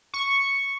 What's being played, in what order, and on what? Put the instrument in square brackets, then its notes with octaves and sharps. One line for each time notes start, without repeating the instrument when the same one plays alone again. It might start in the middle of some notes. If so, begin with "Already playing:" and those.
[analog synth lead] C#6